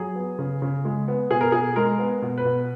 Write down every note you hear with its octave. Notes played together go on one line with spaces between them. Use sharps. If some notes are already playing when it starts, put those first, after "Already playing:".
Already playing: F#3 G#4
B3
C#3
C#3
G#3
B3
B2 G#4
A#4
B2 G#4
G#3 A#4
B3
B2
B4
B2